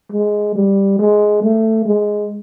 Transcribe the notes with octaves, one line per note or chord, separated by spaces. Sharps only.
G#3
G3
G#3
A3
G#3